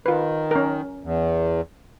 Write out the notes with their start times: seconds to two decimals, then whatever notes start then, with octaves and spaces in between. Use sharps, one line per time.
0.06 D#3 F4 B4
0.51 C#4 A#4
1.03 E2